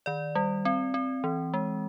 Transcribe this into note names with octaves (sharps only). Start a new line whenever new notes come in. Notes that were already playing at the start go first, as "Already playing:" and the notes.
D#3 D5
G3
C4
C4
E3
G#3